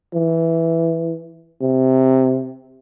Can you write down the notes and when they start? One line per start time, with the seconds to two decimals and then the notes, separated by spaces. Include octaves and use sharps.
0.14 E3
1.61 C3